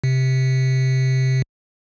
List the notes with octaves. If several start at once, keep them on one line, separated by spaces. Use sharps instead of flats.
C3